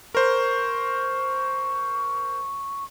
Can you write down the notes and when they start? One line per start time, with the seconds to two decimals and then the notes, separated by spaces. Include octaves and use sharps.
0.15 A#4 C5 C#6